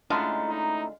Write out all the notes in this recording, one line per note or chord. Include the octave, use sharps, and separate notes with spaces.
D3 G#3 A3 C#4 E4 F4 A#5
D#4